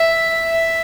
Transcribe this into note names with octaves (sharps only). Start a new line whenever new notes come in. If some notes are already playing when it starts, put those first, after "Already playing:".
Already playing: E5
E5